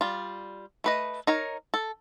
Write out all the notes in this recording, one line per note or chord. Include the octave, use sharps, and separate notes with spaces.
G3 F4
A3 B4 D#5
D#4 A#4 C#5
A4